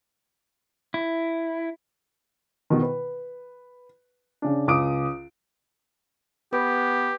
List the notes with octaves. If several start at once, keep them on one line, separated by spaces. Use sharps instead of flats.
E4
B2 D#3
B4
C#3 D4
C#2 D6 D#6 D7
B3 G4 B4